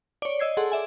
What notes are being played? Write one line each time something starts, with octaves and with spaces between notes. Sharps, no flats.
C#5 D5
D#5 E6 G#6 C7
G#4 A4 F#5 C6
D5 E5 G#5